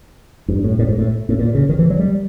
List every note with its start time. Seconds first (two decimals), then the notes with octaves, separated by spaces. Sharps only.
0.48 G2
0.64 A2
0.79 A2
0.88 G#2
0.98 A2
1.29 A2
1.39 A#2
1.55 C#3
1.69 D#3
1.79 E3
1.90 F#3
1.99 G3